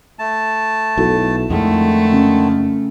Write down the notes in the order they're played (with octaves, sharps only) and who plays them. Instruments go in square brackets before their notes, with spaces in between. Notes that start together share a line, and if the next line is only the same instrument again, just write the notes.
[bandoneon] A3 A5
[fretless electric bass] B1 [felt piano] E4 F#4 A4
[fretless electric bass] F2 G#3 [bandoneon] D3 D#3 [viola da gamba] A3
[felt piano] C#3